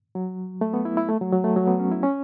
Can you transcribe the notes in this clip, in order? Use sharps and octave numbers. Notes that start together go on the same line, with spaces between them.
F#3
A3
B3
E4
E4
A3
F#3
F#3
A3
F#3
B3
C#4
E4
C#4